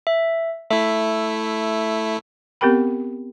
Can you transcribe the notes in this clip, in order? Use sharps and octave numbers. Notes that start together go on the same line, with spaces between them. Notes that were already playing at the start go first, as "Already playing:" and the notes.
E5
A3 E4 E5
B3 C4 G4 A#4 G5 B5